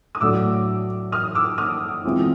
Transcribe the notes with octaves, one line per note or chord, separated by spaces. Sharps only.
D#6
A2 F#3 A3 D4 F#4 D6 E6
D#6 F6
D6 E6
D#6 F6
E3 G#3 C4 F4